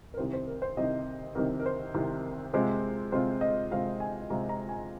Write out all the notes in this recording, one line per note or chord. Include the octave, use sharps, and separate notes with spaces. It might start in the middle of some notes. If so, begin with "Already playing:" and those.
A#4
C2 C3 D#3 C5
C5
A#4
C5
C2 C3 D#3 D#5
C2 C3 D#3 A#4
A#4
C5
C2 C3 D#3
C3 G#3 C4 F4 C5
C3 G#3 C4 F4 C5
D#5
C3 G#3 C4 F4 F5
G#5
C3 G#3 C4 F4 A#5
A#5
G#5